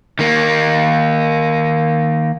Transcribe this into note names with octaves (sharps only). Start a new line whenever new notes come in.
D#3 A#3